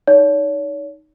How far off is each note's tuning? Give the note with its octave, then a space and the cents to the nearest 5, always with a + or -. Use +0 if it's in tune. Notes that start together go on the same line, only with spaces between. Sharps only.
D#4 +0 C#5 +40